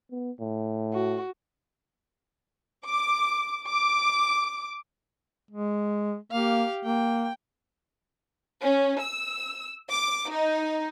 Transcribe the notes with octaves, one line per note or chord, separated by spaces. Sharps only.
B3
A2
F#4
D6
D6
G#3
A#3 G4 F5
A#3 G5
C#4
E6
D6
D#4